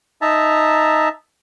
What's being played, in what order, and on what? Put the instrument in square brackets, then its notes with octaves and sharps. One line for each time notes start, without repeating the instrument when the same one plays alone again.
[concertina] D#4 E5 A5 A#5